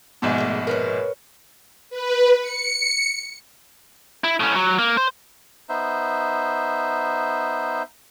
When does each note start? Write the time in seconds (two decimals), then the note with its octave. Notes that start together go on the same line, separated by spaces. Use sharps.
0.22 A#1 G#2 B2
0.38 A3 A#3
0.67 A#4 B4 C#5
1.90 B4
2.41 C#7
4.24 E4
4.40 A2 C#4
4.56 F#3
4.79 A#3
4.97 C5
5.69 B3 D#4 C5 E5